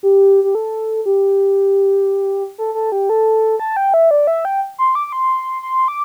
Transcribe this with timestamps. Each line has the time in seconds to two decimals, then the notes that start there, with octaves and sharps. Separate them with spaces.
0.03 G4
0.44 G4
0.55 A4
1.06 G4
2.58 A4
2.75 A4
2.92 G4
3.09 A4
3.60 A5
3.77 G5
3.94 E5
4.11 D5
4.27 E5
4.45 G5
4.78 C6
4.95 D6
5.07 D6
5.12 C6
5.63 C6
5.88 D6